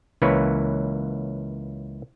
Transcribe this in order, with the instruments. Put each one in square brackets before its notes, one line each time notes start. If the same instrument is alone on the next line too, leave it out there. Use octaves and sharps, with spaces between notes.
[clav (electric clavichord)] C#2 E3 A#3 C#4 B4 C#5